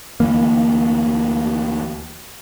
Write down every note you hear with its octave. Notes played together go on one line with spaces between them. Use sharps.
D2 E3 A#3